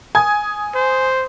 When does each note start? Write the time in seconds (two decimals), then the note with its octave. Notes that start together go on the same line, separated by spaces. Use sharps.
0.15 G#5 D#6 G#6
0.75 C5